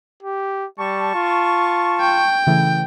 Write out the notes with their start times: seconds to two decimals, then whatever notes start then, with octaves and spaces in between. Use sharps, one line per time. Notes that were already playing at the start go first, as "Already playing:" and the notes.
0.23 G4
0.79 G3 A5 C#6
1.15 F4
2.00 G5
2.47 C#3 E3 A3